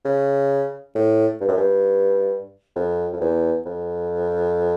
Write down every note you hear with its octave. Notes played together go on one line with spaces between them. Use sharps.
C#3
A2
G2
F#2
G2
F2
F2
E2
F2